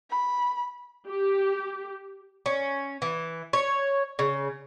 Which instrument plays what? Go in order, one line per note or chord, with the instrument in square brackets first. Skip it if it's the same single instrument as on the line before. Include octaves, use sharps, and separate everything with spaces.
[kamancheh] B5
[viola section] G4
[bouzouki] C#4
E3
C#5
C#3